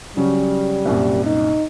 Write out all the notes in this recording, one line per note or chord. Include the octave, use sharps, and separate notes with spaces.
C#3 F#3 G3 C#4
C2 F#2 A#2
D#4